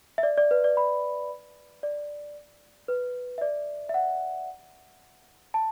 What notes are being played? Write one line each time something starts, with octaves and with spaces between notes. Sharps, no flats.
E5
D5
D5
B4
D5
B5
D5
B4
E5
D5
E5
F#5
A5